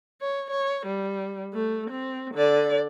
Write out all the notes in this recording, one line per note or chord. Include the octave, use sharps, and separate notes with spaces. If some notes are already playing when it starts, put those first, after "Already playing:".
C#5
C#5
G3
A3
C4
D3 D5